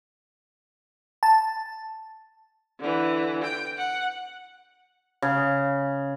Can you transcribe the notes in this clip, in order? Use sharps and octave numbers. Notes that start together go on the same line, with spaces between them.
A5
D3 E3
G5
F#5
C#3